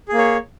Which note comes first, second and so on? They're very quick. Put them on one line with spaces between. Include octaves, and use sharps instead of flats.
G#4 A#3 C#5